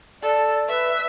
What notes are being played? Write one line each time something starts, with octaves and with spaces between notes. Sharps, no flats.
A4 D5
B4 E5